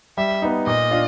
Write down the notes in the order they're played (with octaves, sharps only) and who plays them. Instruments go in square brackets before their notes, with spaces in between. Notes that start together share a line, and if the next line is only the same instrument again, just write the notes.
[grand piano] G3 [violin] E5
[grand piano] B3 D#4
[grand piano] A#2 [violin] D#5
[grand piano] D4 F4